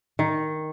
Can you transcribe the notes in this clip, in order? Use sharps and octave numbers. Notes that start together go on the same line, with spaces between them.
D#3